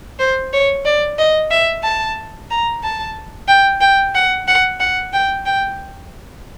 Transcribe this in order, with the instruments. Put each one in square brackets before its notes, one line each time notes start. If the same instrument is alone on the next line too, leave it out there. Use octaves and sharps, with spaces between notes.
[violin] C5
C#5
D5
D#5
E5
A5
A#5
A5
G5
G5
F#5
F#5
F#5
G5
G5